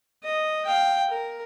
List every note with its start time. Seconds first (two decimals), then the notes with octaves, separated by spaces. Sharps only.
0.24 D#5
0.66 F5 G5
1.10 A#4